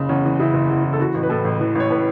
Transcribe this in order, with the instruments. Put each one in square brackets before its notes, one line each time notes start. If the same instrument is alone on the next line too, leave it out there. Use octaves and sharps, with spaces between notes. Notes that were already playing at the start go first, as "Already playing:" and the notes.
Already playing: [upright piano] F#1 C#3
E2 C#4
E3
C#3 E4
F#1
E2
E3
A4
E3 F#4
A1
B4
A2 A4
A1
E3
A1 C#5
A2 B4